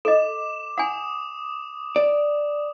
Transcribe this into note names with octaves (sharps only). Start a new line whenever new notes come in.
A4 D#5 D6 E7
F#5 G#5 D#6
D5